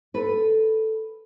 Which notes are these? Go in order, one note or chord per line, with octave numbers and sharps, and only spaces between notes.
A4 B4